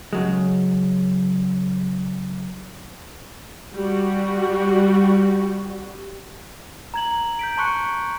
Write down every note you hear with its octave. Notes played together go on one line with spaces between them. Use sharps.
C#3 F#3 G#3
G3 F#4
A#5 G#6 F#7
G6 B6 D7
A5 C6 C#6 F#6 C#7